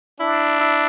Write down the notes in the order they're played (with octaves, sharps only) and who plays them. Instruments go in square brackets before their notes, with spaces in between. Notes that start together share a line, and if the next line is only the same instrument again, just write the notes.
[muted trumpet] D4 [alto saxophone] E4
[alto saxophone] E4